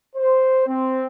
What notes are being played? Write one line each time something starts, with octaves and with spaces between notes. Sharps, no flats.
C5
C4